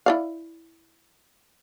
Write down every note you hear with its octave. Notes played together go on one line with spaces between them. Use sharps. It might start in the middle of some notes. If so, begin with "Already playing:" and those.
E4 D5 F5